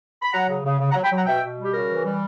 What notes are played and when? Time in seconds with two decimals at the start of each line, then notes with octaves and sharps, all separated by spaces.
0.22 B5
0.33 F#3 F#5 A#5
0.49 C#3
0.64 C#3
0.80 C#3
0.91 F#5 A#5
0.96 F#3
1.04 G5 B5
1.11 F#3 F#5 A#5
1.26 B2 E5 G5
1.43 B2
1.58 G3 G4
1.74 C#3 F#4 A#4
1.90 E3
2.05 G3